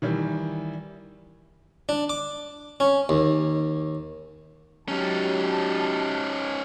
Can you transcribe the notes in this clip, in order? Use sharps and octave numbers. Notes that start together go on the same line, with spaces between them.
D#3 E3 G3
D4
D6
C#4
D#2
F#3 C#4 D#4 G4 A5